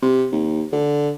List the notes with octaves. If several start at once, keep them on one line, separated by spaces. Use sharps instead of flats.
C3
D#2
D3